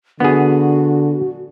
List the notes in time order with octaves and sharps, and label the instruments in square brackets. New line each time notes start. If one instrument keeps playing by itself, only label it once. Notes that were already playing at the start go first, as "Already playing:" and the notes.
[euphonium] D3 [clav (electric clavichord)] B3 G#4 [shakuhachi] F#4